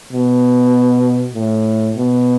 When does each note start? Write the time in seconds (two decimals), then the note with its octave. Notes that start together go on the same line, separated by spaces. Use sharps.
0.13 B2
1.34 A2
1.96 B2